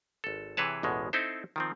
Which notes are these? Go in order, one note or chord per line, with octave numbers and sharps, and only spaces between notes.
G#1 A4
C3 E3 G#4 B4 C#5 A5
A1 E2 B2 G#3
C4 D#4 E4 A4 C5
D#3 F3 C4